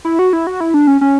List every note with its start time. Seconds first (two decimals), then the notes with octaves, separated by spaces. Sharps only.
0.05 E4
0.19 F#4
0.33 E4
0.47 F#4
0.60 E4
0.74 D4
0.87 C#4
1.01 C#4